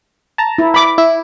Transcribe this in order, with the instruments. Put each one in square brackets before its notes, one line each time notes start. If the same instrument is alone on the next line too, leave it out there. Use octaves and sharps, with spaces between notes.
[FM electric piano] A5 A#5
[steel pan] E4
B5 D6
[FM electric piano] E4